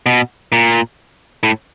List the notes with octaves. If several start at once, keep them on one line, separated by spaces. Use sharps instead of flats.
B2
A#2
A2